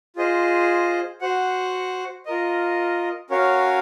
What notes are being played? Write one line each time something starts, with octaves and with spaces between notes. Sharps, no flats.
F4 G#4 C5 D#5
F#4 C5 F#5
F4 A#4 D#5
C#4 F#4 A#4 C#5 F5